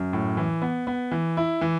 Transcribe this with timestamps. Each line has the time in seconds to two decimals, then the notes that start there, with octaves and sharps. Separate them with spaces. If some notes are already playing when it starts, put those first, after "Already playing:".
Already playing: F#2
0.13 A2
0.37 E3
0.62 B3
0.87 B3
1.11 E3
1.37 E4
1.61 E3